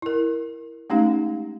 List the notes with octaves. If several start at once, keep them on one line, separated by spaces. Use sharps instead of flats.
E4 A#4
G#3 A3 C#4 D#4 G4 F5